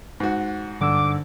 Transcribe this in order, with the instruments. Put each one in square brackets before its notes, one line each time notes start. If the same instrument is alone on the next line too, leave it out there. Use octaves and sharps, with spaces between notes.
[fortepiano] G#2 F#4
[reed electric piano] G2 E6 [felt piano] D3 [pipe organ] D6